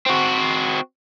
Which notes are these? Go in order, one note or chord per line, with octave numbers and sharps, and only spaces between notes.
C4 F#4